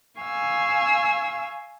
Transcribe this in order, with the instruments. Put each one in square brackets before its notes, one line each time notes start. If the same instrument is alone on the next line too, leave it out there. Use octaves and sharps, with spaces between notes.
[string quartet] F5 G#5 C#6 E6